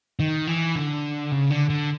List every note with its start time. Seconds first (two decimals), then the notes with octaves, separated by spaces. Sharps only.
0.20 D#3
0.47 E3
0.76 D3
1.32 C#3
1.50 D3
1.70 D3